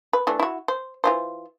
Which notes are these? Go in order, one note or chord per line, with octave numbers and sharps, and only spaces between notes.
B4
E3 A3 D4
E4 F#4
C5
E3 F4 C5